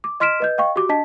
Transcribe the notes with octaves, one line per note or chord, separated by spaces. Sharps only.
D6
D#5 C6 F6 B6 D7 E7
B4 D#5 G6
D#5 F5 G5 C#6
F#4 G4 D6
D4 D#5 A5 B6